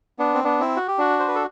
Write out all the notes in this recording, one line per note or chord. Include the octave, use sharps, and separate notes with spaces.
B3 D4
C4
B3 D4
C4 E4
F#4
G4
D4 F#4
C5
B4
A4